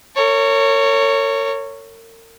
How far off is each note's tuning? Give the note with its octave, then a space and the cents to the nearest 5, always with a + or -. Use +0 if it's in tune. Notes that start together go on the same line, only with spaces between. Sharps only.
A#4 -40 C#5 +0